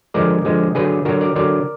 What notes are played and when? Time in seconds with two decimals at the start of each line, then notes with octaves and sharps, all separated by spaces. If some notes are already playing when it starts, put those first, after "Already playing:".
0.14 D3 F3 G#3 A#4 D5
0.45 D3 F3 G#3
0.75 D3 F#3 G#4 B4
1.05 D3 F#3 F#4 A#4
1.21 A#4 D5
1.36 D3 F#3 A#4 D5